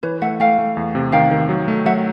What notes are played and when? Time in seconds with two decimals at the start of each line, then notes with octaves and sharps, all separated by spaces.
0.03 E3 B4 C#5
0.21 A3 E5 F#5
0.40 A3 F5 G5
0.59 A3
0.77 E2
0.95 C3
1.12 D#3 F5 G5
1.31 D#3
1.49 F#3
1.68 A3
1.86 F#3 E5 F#5